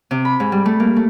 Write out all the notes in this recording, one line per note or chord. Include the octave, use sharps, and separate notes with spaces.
C3
B5
G#2
G3
A3
A#3
A3